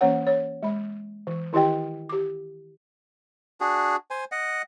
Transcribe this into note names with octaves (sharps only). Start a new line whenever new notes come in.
E3 A#3 C#4 C#5 F#5
C#5
G#3 B5
E3
D#3 E4 G4 D#5 G5
G4 D6
D4 F#4 G#4
C5 G#5
D#5 F#5